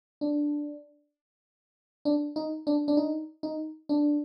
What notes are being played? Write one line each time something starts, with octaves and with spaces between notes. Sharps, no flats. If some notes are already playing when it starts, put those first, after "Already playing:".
D4
D4
D#4
D4
D4
D#4
D#4
D4